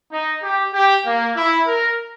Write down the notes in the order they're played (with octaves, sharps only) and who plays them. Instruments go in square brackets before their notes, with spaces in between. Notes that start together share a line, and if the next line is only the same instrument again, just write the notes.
[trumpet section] D#4
G4
G4
A#3
E4
A#4